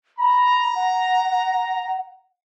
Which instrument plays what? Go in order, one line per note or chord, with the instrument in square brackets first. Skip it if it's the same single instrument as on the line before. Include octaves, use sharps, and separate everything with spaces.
[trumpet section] A#5 [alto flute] B5
[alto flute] F#5